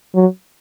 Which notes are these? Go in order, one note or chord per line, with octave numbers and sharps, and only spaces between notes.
F#3